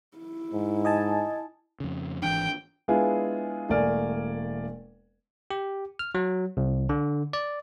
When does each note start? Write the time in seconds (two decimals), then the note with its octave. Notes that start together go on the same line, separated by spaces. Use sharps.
0.17 E4
0.53 G#2
0.85 D#5 G#5 A5
1.80 F2 C#3
2.22 G#1 E3 D4 G5
2.88 G#3 B3 D4 E4 F4 G#4
3.69 E1 A3 A#3 D5 G#5 F6
5.51 G4
5.99 F6
6.15 F#3
6.57 C2
6.89 D3
7.33 D5